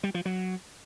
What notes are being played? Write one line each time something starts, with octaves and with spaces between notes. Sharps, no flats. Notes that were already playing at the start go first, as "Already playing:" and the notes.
G3
F3
F#3